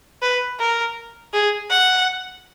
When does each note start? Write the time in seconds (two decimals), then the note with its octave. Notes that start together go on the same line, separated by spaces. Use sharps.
0.22 B4
0.60 A#4
1.33 G#4
1.70 F#5